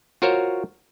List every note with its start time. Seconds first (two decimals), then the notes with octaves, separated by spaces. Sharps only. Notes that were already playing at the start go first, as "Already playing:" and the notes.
0.22 F4 F#4 A#4 C5 C#5